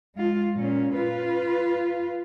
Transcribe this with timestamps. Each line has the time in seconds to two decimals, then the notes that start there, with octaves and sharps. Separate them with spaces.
0.15 G#3 F4
0.56 A#2 C#4
0.96 F4 B4